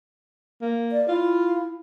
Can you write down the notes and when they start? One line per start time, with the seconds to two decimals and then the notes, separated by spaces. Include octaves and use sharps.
0.62 A#3
0.92 D5
1.09 E4 F4